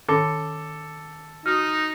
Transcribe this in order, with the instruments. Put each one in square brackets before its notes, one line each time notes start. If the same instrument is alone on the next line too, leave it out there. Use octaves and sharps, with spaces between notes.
[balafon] D#3 C#4 [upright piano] A4 [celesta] D6
[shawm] D#4 [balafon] F#4 [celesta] D#6 F6